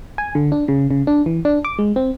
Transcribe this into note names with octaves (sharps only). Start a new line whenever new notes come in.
G#5
D3
D4
C#3
C#3
D4
E3
D4
D6
G#3
C4